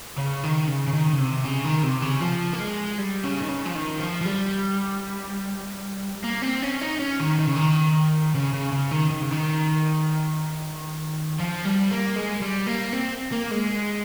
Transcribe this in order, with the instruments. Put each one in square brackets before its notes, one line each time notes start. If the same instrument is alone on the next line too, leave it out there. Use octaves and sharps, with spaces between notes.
[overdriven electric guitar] C#3
D#3
C#3
C#3
D#3
C#3
C3
C#3
D#3
C3
C#3
F3
A#3
G#3
G3
C#3
D#3
C#3
F3
D#3
F3
F3
G3
A#3
C4
C#4
D#4
C#4
D#3
D#3
C#3
D#3
C#3
C#3
C#3
D#3
D#3
C#3
D#3
F3
G3
A#3
G#3
G3
A#3
C4
A#3
G#3